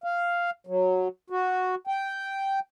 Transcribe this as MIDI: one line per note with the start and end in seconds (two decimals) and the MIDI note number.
0.04 0.50 77
0.67 1.08 54
1.30 1.75 66
1.87 2.60 79